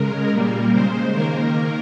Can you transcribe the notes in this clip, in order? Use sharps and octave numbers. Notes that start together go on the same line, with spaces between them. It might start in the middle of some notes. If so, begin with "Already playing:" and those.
Already playing: C#3 G#3 A#4
A#2 G3 A#3 A#4
C#3 G#3 C5
D#3 A#3 A#4